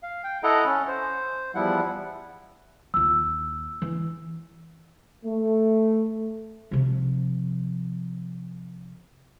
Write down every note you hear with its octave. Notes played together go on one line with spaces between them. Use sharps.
F5
G5
E4 A4 D#5 F#5 A#5
C#4
C5
E2 F3 G3 E4 F#5
D#2 F4 E6
E3
A3
C3 F3